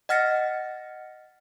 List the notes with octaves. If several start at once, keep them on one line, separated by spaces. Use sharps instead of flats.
D#5 F#5 F6 A6 A#6 C#7